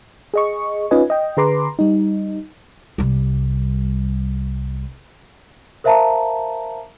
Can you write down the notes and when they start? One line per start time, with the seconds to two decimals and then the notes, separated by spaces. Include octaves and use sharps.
0.34 G#4 D#5 C#6
0.91 C#4 D#4 F4 B4 D#5 G#5
1.10 D#5 G5
1.37 D3 G#4 B4 A#5 C6 D6
1.79 G3 D#4
2.98 C2 G3
5.84 A#4 C5 E5 F5 A5 A#5